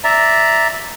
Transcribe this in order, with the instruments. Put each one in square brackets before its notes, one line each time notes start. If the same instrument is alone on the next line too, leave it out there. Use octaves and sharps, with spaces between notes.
[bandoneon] D5 E5 A#5